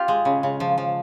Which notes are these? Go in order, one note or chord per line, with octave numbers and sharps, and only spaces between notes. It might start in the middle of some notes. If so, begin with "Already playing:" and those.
Already playing: F4 G4
G#3
C#3
C#3
F3
F3